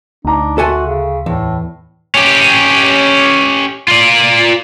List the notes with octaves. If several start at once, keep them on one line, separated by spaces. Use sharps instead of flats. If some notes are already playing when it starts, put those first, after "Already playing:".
D2 D4 D#4 A#5
F#4 A4 E5 F#5 G#5 C6
C#3
E2 A2
C#4 G4
F4 D5